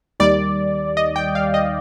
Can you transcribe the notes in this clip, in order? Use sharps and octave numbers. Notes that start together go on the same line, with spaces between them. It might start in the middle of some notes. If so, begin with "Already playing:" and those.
D#2 D#3 G3 D5
D#5
G5
F5
D#5